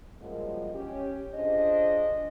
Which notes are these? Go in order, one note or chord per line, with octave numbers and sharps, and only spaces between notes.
F#2 A#2 F3 G3 G#3 D#5
C#4 G4
D4 F4 G#4 C5 D#5